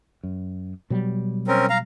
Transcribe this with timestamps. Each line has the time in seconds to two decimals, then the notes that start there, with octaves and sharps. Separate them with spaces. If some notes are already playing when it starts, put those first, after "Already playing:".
0.23 F#2
0.90 B2 F#3 G3
1.47 C4 C#4 A#4
1.70 F5 A#5